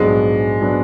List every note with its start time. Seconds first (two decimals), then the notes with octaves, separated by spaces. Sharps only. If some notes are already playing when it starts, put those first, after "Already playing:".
Already playing: A#1 G#2 F#3 G#3 B3 D4
0.61 F#3 B3 D4